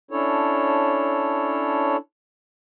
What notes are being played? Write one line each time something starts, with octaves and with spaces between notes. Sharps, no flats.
C#4 D4 E4 A4 C#5